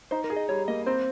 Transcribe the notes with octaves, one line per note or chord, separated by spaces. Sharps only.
D#4 C5
A#4
G#4
D#5
G3 C#5
A#3 D#5
C4 C5